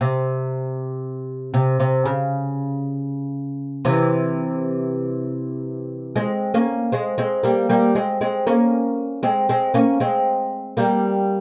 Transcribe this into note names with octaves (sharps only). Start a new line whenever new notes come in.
C3
C3
C3
C#3
C3 E3
G#3 C4
A#3 C#4
G#3 C4
G#3 C4
G3 A#3
G3 A#3
G#3 C4
G#3 C4
A#3 C#4
G#3 C4
G#3 C4
A#3 C#4
G#3 C4
G3 A#3